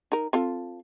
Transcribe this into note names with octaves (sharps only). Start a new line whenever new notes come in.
D#4 A#4
C4 F4 A4